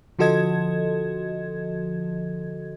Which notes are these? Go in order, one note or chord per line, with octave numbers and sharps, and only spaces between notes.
D3 F3 F#4 A4 D#5 G#6